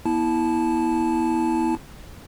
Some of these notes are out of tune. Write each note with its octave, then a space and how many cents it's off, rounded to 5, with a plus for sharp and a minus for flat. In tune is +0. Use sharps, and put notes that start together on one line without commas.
B3 -25 E4 -20 A5 -15